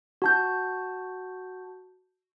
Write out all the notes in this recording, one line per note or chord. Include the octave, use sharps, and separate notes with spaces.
F#4 A5 G6